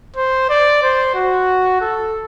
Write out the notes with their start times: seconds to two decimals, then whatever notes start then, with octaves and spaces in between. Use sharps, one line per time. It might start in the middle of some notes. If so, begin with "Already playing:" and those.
0.16 C5
0.49 D5
0.82 C5
1.15 F#4
1.81 A4